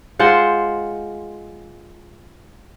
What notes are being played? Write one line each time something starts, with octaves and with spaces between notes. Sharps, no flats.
G#3 F4 C5 F#5